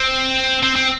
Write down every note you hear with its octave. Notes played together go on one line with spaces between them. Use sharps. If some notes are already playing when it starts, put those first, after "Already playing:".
Already playing: C4
C4
C4